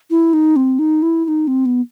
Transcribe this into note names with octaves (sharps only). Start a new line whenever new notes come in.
E4
D#4
C4
D#4
E4
E4
D#4
C4
B3